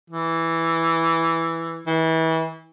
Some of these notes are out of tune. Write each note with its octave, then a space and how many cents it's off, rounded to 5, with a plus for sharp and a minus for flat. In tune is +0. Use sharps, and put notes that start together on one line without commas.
E3 +0
E3 -30